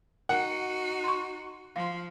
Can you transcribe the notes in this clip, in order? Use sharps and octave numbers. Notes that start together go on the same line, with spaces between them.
D#4 F#4 A#4 F#5
C6 C#6
F3 F5 C6